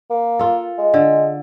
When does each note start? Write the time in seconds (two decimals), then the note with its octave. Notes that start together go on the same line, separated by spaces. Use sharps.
0.10 A#3
0.39 F4 A4
0.78 G#3
0.94 D3